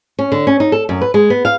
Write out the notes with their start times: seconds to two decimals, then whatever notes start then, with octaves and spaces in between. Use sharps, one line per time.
0.19 C#4
0.32 D3
0.47 C#4
0.60 D#4
0.72 A4
0.89 F#2
1.01 B4
1.14 G#3
1.30 B3
1.45 F5